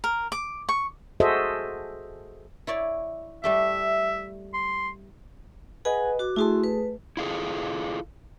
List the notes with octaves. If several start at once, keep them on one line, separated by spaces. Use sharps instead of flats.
A#4
D6
C#6
F#4 G#4 A4 C5 D#5 E5
E4 C#5 D5
G3 A3 G4 E5
C6
G#4 B4 D#5 F#5 G#5
F#4 D6
A3 E4 F#4 G#4 A5 C6
B4
E4 F4 G#4 A4